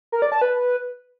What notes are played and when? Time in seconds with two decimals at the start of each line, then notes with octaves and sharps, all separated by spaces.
0.12 A#4
0.22 D5
0.32 A5
0.42 B4